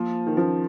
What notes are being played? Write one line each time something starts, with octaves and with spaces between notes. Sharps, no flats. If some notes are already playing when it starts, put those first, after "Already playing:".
Already playing: F3 A#3
D#3
F3 C#4